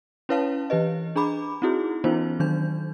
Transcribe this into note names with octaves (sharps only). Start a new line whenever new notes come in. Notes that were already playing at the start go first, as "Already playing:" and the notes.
C#4 E4 B4 C#5 F5 A5
E3 G4 B4 D#5
D4 G#4 A#5 B5 D6
C4 D#4 E4 F#4 G#4
E3 B3 C#4 D#4 F4 C5
D#3 F#3 D4 D#4 G6